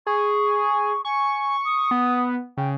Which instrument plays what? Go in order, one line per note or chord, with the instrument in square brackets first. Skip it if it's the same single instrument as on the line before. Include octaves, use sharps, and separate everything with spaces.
[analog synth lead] G#4 [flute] C#6
[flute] G#5 [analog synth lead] C#6
[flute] D#6
[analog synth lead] B3
[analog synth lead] C#3 [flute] G5